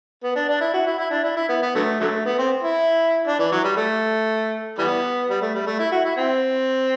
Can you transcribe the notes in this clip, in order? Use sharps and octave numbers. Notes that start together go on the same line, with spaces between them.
B3
D4
D4
E4
F#4
E4
E4
D4
E4
E4
B3
B3
D3 F#3 A3
D3 F#3 A3
B3
C4
E4
D4
E3
F#3
G3
A3
E3 G3 B3
G3
A3
G3
A3
E4
F#4
E4
C4